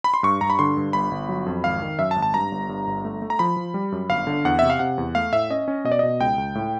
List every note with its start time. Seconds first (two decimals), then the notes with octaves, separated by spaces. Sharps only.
0.04 B5
0.14 C6
0.23 G2 C#6
0.41 G2 A#5
0.50 B5
0.59 D3 C6
0.77 G2
0.93 G1 B5
1.11 G1
1.29 F#3
1.46 F2
1.64 G#1 F5
1.82 D#3
1.99 F#2 E5
2.11 A5
2.16 G#1
2.22 A5
2.34 G2 A#5
2.52 G1
2.69 G2
2.87 G1
3.04 A3
3.22 A3
3.30 A#5
3.39 F3 B5
3.57 F3
3.74 G3
3.92 F#2
4.09 G1 F5
4.27 D3
4.45 E2 F#5
4.59 C3 E5
4.70 F5
4.79 C3 F#5
4.98 E2
5.15 A3 F5
5.32 A2 E5
5.50 C#4 D#5
5.68 C#4
5.84 B2 D#5
5.92 D5
5.99 B2 D#5
6.20 C#2 G5
6.38 C#2
6.55 A2